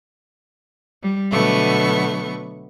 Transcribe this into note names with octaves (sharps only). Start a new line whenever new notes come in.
G3
B2 D3 F#3 A3 B3 C#6